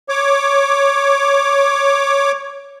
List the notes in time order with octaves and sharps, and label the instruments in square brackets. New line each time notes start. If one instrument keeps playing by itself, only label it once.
[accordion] C#5 D6